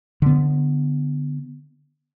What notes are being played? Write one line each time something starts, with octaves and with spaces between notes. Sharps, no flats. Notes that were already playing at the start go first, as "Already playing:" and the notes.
D3 B3